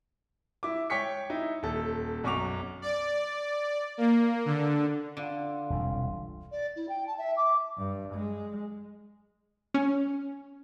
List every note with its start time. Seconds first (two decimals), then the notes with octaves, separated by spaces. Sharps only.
0.63 E4 D6
0.90 C#5 G5 C#6 B6 C#7
1.30 D#4 E4
1.63 D#1 A4
2.24 B1 F#2 C#6 D6 F7
2.82 D5
3.98 A#3
4.45 D3
5.17 D3 F4
5.70 E1 C2 G2
6.51 D5
6.75 E4
6.88 G5
7.06 A5
7.18 E5
7.36 D6
7.78 G2
8.14 G#3
9.74 C#4